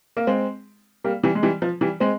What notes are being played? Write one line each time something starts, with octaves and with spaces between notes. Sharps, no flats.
A#3
G#3 C4
G3 A#3
E3 G3
G#3
E3 G3
F3
E3 G3
G#3 C4